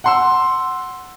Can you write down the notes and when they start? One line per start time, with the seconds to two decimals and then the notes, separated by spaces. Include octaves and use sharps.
0.04 F#5 C6 E6